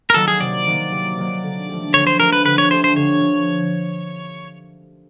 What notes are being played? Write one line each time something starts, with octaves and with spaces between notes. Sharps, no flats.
A#4
D#3 F#3 A#3 A4
G#4
C3 D5
D#3 F#3 A#3
C3
D#3 F#3 A#3
D3
F3 A3 D4 G4
D3 C#5
C5
F3 A3 D4 G4 A#4
B4
D3 B4
C#5
F3 A3 D4 G4 C5
C5
D3 C#5
F3